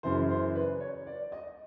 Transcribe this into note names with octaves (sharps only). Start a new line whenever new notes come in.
F#2 C#3 E3 C5
C5
B4
C#5
D5
D#5